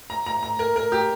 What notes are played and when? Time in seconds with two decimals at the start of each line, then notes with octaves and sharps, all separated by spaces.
0.10 A#5
0.26 A#5
0.43 A#5
0.59 A#4
0.76 A#4
0.92 G4